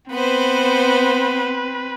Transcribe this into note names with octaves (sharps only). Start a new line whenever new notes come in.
B3 C4 B4 C5